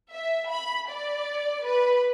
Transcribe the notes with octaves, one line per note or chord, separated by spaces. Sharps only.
E5
B5
D5
B4